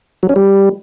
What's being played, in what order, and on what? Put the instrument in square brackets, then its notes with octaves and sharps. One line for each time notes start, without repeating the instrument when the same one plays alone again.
[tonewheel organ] F#3
C#4
G3